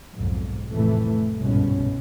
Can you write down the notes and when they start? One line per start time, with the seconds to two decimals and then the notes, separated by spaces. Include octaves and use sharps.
0.15 B1 F2 G#2
0.71 F1 A2 E3 A3
1.38 G1 C2 G#2 B2 C#4